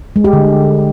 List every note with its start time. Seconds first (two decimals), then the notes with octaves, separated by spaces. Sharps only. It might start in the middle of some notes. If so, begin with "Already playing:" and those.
0.16 G#3
0.24 G4
0.33 D3